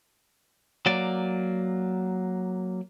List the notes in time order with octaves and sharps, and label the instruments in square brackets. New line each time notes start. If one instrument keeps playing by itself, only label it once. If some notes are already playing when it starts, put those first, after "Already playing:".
[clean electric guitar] F#3 A#3 D5